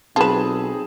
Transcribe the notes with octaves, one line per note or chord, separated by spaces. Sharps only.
B1 C4 F4 G#4 B4 A5 E7